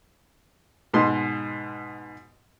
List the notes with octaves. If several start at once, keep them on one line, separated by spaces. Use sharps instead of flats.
G#2 B2 C6